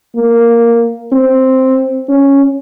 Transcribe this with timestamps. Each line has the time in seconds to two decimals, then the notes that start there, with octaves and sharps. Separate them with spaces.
0.16 A#3
1.12 C4
2.09 C#4